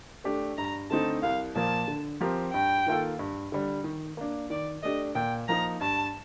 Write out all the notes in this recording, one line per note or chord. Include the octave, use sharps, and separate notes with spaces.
A3 D4 G4
G2 A#5
D3 A3 C4 D#4 A5
C2 F5
A#2 F3 A#3 A5
D3
F3 C4 G4 A#4
G2 G5
D#3 A#3 F4 A4
G2
D3 G3
D#3
A#3 D4
D#3 D5
A3 D4 G4 D#5
A#2 G5
F3 A#3 D#4 A#4 A#5
G2 A5